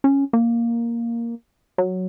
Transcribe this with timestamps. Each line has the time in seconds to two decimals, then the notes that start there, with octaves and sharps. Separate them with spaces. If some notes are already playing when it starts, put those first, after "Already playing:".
0.04 C#4
0.33 A#3
1.78 F#3